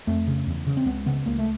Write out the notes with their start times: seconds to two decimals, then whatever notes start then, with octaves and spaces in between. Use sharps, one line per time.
0.07 F2 A3
0.27 C#3
0.47 E2
0.67 C#3
0.77 C4
0.86 C#2 B3
1.06 C#3 B3
1.26 C#2 A#3
1.38 A3